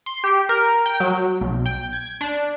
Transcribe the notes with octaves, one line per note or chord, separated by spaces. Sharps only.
C6
G4
A#4
G5
F#3
B1
G5
G#6
D4